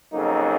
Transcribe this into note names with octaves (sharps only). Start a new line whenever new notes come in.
F2 C#3 F#3 A#3 D#4